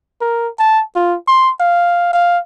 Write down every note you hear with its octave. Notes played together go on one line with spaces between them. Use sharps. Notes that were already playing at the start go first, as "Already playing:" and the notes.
A#4
A5
F4
C6
F5
F5